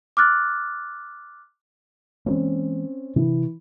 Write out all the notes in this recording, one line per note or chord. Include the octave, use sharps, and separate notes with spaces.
D6 F6 F#6 A6
E3 G#3 A#3 C4 C#4
C3 E3